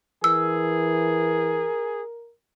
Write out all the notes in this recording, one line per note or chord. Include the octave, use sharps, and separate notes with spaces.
E3 G#4 A#4 E6